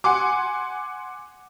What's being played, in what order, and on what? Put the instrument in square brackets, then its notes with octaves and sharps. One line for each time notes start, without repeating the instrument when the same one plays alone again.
[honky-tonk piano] F#5 G#5 C6 D6